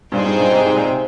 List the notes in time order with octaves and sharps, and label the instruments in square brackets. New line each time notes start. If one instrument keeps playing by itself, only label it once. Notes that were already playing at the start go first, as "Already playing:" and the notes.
[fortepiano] G2 A#2 [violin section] D#4 G#4 C5 G5
[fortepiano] G2
G2 A#2
G#2 C3
G#2 C3
A#2
C3